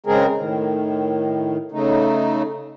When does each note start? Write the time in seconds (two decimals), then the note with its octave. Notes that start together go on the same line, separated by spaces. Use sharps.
0.06 C#3 G#3 C4 G#4 A#4
0.38 A2 D#3
1.72 C#3 A3 D#4